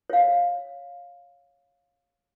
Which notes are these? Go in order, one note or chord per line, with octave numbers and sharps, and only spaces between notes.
C#5 F5